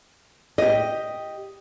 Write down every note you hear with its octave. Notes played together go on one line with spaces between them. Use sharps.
G4 D#5